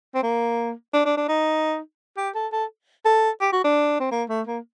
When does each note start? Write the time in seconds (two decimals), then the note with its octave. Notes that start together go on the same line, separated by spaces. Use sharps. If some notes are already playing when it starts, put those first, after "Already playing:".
0.15 C4
0.23 A#3
0.94 D4
1.05 D4
1.17 D4
1.29 D#4
2.17 G4
2.35 A4
2.52 A4
3.05 A4
3.41 G4
3.53 F#4
3.64 D4
4.00 C4
4.11 A#3
4.29 A3
4.47 A#3